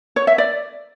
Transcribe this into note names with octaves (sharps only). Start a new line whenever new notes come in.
C#5
E5
D5